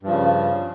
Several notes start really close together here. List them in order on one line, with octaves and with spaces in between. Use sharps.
G2 F3 C#3